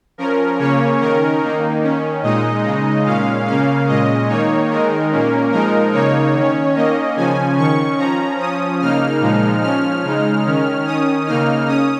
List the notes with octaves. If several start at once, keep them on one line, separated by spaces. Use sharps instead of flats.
F3 C#4 A#4
C#3 A#3 C#4 C#5
D#3 C#4 A#4
D#3 A#3 D#4
D#3 C#4
A#2 G#3 D#4 D#5
C#3 G#3 D#4
A#2 G#3 C#4 F5
C#3 A#3 C#4 F5
A#2 G#3 C#4 D#5
D#3 A#3 D#4 C#5
D#3 G#3 D#4 A#4
A#2 A#3 C#4
F3 G#3 D#4 A#4
C#3 A#3 D#4 C#5
D#3 C#4
D#3 A#3 C#4 D#5
C#3 F3 C#4 G#5
D#3 C#4 C#6
F3 C#4 A#5
F3 C#4 D#6
C#3 A#3 D#4 F6
A#2 F3 G#3 D#4
F3 C#4 F6
C#3 G#3 D#4
D#3 C#4
D#3 C#4 D#6
C#3 A#3 D#4 F6
C#4 D#6